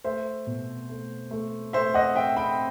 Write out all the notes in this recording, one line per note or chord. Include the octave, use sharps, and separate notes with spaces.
A3 C5 E5
B2
A3
A3
A3 C5 E5
D#5 F#5
C4 E5 G5
G5 B5